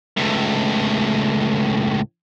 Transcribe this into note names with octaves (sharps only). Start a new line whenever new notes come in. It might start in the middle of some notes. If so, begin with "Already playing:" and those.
C#2 A2